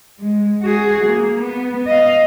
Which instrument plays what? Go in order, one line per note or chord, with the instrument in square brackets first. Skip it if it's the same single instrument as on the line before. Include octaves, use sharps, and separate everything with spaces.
[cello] G#3
F#4 G#4
A#3
B3
D#5 F5